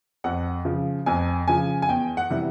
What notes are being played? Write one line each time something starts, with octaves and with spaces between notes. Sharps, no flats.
F2 F#5
C#3 F3
F2 G#5
C#3 F3 G#5
G#5
E2 G5
F#5
C3 E3 G3